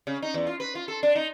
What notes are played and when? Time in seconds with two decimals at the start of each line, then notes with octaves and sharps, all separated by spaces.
0.07 C#3
0.22 D#4
0.34 E2
0.47 F4
0.60 B4
0.75 F4
0.88 A4
1.03 D4
1.16 D#4